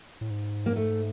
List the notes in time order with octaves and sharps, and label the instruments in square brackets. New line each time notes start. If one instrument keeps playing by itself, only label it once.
[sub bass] A2
G#2
[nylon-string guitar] A#3
A3